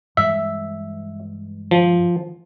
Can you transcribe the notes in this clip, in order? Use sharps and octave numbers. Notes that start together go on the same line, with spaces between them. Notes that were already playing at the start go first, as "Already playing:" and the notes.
G2 E3 G#3 E5
F3